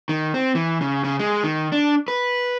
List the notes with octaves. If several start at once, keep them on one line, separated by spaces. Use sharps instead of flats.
D#3
C4
E3
C#3
C#3
G#3
D#3
D4
B4